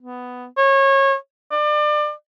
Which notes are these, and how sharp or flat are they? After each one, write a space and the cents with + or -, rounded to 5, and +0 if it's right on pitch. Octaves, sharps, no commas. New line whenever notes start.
B3 +10
C#5 -25
D5 +30